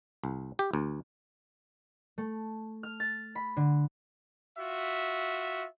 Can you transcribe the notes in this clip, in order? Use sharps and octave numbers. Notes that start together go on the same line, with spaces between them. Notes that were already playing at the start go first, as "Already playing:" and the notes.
C2
G4
D2
A3
F6
A6
B5
D3
F4 F#4 E5